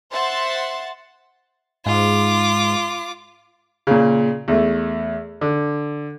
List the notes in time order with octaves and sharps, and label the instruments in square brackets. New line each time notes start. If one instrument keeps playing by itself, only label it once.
[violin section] C5 E5 F#5 C6 A6
[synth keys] G#2 [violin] F4 D6
[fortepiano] A#2 C#3
E2 A3
D3